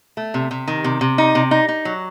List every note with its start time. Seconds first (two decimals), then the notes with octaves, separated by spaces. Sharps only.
0.17 A3
0.34 C3
0.51 C3
0.68 D#3
0.84 C3
1.01 C3
1.18 D#4
1.35 C3
1.51 D#4
1.68 D#4
1.85 F#3